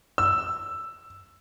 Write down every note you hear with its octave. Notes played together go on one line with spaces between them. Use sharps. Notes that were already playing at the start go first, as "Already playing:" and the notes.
E6